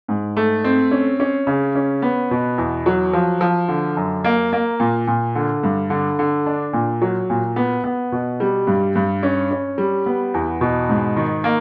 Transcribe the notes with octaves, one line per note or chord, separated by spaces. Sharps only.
G#2
A3
C4
C#4
C#4
C#3
C#4
B3
B2
E2
F#3
F3
F3
D3
F#2
A#3
A#3
A#2
A#2
D3
G2
D3
D3
D4
A#2
F#3
A#2
B3
B3
B2
G3
G2
G2
C#4
C#4
G3
B3
E2
B2
G#2
D#3
A#3